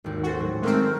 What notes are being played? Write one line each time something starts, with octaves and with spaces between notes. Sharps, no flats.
G#1 D#2
C#4 F#4 A4 C5
A2 F#3
G#3 A3 C4 A#4